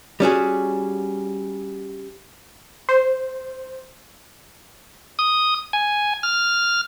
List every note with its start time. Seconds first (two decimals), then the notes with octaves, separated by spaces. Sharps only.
0.20 G3 C#4 F#4 G#4
2.89 C5
5.19 D#6
5.73 G#5
6.23 F6